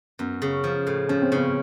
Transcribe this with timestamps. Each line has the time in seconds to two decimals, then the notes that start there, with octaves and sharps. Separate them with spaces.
0.19 F#2 B3
0.42 C#3
0.64 F3
0.87 A2
1.09 F3 C#4
1.22 C4
1.32 C#3 B3 C#4